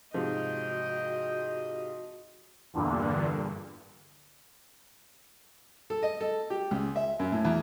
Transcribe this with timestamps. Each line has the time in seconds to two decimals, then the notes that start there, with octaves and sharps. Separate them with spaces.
0.14 G#2 C3 F3 F#4 D#5 G5
2.73 E2 G2 A#2 D3
5.90 A4
6.03 D#5
6.21 A4
6.50 G4
6.71 C#2
6.96 E5
7.19 F#2
7.32 A2
7.45 E2